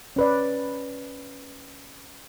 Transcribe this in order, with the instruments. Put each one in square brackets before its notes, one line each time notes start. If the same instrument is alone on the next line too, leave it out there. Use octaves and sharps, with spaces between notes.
[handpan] C#4 B4 D5